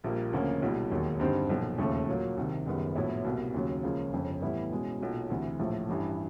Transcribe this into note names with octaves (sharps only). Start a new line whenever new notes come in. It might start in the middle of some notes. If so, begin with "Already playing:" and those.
A#1 A#2 G3 A#3
D2 C#3 F3 A#3 C#4
B1 A#2 G3
E1 D#2 D#3 F#3
G2 D3 G3 C4 D#4
B1 A#2 F3
E1 D#2 C#3 F3 A3
A#2 F#3 A#3
C2 C3 D#3
F#1 F#2 D#3 G3 B3
A#1 A2 F#3 B3 E4
C2 B2 G3 A#3
D#2 C#3 F#3
C#2 C#3 F3 A#3 C#4
G1 F2 C#3
A2 E3 G3 B3 E4
B2 G#3 C#4 E4
B1 A#2 F#3
D2 C3 E3
A#1 A2 F3 A3
A1 G2 E3